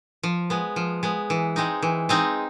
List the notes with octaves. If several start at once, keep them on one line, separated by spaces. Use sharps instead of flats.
F3
G#3 B3
F3
G#3 B3
E3
G#3 C4 D#4
E3
G#3 C4 D#4